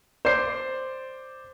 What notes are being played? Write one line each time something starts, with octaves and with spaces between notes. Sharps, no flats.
C5 D5 C7